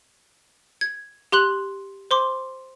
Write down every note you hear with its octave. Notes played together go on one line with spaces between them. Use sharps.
G#6
G4 C6 F#6 F#7
C5 C6 D6